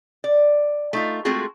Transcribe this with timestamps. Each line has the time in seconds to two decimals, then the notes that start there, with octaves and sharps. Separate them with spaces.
0.24 D5
0.93 A3 D#4 F4
1.25 G#3 A3 C4 F4 F#4 G#4